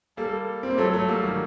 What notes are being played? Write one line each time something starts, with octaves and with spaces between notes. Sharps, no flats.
G3 A#3 A4
C4
A#3
F#3 A3 A4
F#3 A3
G3 A#3
D#3 G3